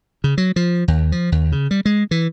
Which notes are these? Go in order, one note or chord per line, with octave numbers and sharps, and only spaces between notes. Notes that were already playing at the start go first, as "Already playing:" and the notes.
C#3
F#3
F3
D#2
F3
D#2
C#3
G3
G#3
E3